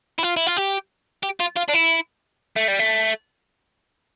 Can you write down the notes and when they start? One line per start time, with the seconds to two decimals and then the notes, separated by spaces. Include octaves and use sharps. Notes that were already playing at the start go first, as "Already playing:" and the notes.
0.19 E4
0.23 F4
0.37 E4
0.47 F4
0.57 G4
1.23 G4
1.40 F4
1.56 F4
1.68 D4
1.73 E4
2.56 A3
2.68 G3
2.79 A3